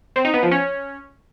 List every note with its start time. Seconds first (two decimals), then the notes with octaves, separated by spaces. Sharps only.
0.16 C4
0.25 D#4
0.34 B3
0.43 F3
0.51 C#4